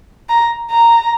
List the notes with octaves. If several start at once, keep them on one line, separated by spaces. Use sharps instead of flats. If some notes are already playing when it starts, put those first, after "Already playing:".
A#5
A#5